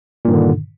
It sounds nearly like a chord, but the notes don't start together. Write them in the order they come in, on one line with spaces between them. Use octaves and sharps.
A#2 G2 D#3 D3